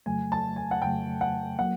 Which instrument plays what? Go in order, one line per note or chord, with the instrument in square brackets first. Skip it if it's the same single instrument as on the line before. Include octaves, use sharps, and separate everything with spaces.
[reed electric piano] F2 C#3 F#3 A3 [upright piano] G#5
[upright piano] A5
G#5
F#5
[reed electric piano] F2 C#3 F#3 A3 [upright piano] G5
[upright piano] F#5
[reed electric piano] F#3 A#3 [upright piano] F#5